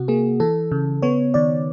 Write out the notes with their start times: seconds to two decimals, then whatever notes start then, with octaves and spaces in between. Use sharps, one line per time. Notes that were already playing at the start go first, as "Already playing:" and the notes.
Already playing: C3 F#4
0.08 A#3 G#4
0.40 E3 A4
0.72 C#3
1.02 B3 C#5
1.34 D#3 D5